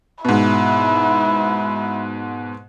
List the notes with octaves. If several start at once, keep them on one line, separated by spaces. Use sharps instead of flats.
G#2 B2 E4